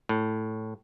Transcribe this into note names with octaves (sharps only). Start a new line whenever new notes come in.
A2